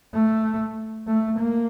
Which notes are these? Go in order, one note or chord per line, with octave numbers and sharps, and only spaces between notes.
A3
A3
A#3